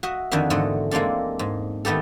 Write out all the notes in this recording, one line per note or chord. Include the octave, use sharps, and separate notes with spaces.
F#4 D#5 E5
F2 D3 D#3 F#4 E5
E2 G#2 D3 A3 D#5 F#5
G#3 A#3 C4 D4 A4
G#2
D#3 A3 B3 G4 A4